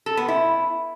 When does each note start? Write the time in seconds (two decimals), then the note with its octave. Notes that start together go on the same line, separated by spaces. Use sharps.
0.06 A4
0.17 B3
0.28 E4